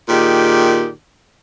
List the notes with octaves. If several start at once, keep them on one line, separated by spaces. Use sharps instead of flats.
A#2 D#3 G4 G#4